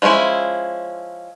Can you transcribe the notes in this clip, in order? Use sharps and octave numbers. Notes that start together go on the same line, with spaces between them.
F3 G#3 C4 C#4 E4